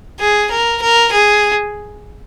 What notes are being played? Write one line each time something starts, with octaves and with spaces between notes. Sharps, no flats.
G#4
A#4
A#4
G#4